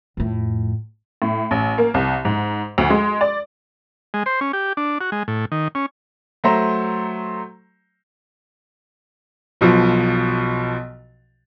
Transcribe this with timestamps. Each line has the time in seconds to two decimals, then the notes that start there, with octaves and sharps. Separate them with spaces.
0.17 F2 A2
1.22 A2
1.51 A1
1.78 A#3
1.94 C2
2.25 G#2
2.78 D2
2.90 G#3
3.21 D5
4.14 G#3
4.26 C5
4.41 C#4
4.53 G4
4.77 D4
5.01 F#4
5.12 G#3
5.28 A2
5.52 D#3
5.75 C#4
6.44 F#3 A3 C5 A#5 C6
9.61 B1 B2 F3